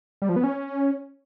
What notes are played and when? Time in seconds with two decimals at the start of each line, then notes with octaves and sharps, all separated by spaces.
0.22 G3
0.29 F3
0.36 B3
0.44 C#4